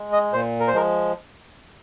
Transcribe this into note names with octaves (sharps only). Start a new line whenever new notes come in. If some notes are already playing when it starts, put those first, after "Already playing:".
Already playing: G#3
D#5
A#2 C5
A#4
C5
F3 G#3 A#4